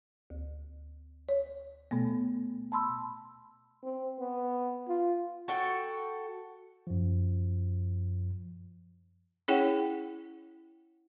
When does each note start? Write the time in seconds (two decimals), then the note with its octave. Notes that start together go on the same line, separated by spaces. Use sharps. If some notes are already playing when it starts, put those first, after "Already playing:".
0.30 D2
1.29 C#5
1.91 B2 A3 B3
2.72 A5 B5 C6 E6
3.84 C4
4.20 B3
4.89 F4
5.48 F#4 A4 G5
6.87 F#2 F3
9.48 C#4 E4 G#4 C#5 F#5 G5